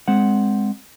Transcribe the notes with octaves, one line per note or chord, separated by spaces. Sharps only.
G#3 C4 F#5